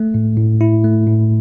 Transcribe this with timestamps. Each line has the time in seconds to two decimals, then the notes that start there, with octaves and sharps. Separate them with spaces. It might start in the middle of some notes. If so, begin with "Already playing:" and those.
Already playing: A3
0.14 A2
0.37 A2
0.61 E4
0.84 A3
1.07 A2